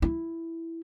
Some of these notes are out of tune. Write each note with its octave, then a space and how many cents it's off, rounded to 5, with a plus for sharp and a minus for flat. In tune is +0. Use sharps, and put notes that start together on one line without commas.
E4 +5